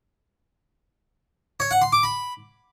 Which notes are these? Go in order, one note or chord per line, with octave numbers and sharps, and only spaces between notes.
C#5
F#5
C6
D6
B5